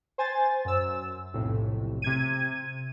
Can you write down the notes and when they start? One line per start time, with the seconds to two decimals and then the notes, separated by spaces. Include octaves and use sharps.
0.18 C5 G#5 A6
0.65 F#2 E6
1.33 B1 F2 A2 C3
2.02 C3 G#6 D#7